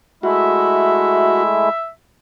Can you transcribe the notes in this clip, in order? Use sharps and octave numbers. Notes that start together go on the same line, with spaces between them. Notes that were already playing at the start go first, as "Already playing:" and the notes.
G#3 A3 E4 F#4 E5